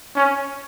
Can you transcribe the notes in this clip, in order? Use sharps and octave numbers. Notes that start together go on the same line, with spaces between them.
C#4